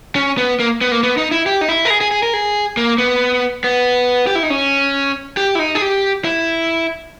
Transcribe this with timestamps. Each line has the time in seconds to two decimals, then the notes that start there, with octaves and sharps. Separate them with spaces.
0.16 C#4
0.38 B3
0.60 A#3
0.81 B3
0.92 A#3
1.03 B3
1.17 D#4
1.31 E4
1.46 G4
1.61 D#4
1.69 E4
1.85 A#4
1.90 G#4
2.01 G#4
2.11 G#4
2.23 A#4
2.33 G#4
2.77 A#3
2.98 B3
3.64 B3
4.27 G4
4.35 E4
4.43 D#4
4.50 C#4
5.37 G4
5.55 E4
5.59 D#4
5.75 G#4
5.82 G4
6.24 E4